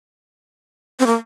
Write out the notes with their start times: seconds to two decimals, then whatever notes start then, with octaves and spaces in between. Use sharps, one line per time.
1.00 C4
1.06 A#3